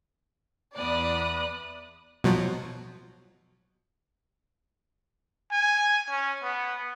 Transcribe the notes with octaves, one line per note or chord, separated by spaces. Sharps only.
E2 D5 B5 D#6 F#6
B2 F3 F#3
G#5
C#4
B3